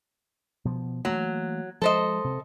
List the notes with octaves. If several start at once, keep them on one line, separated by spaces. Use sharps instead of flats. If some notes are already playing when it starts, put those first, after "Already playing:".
B2 F3
E3 F#3 A3 A#3
F3 G#3 A4 C5 D#5
C3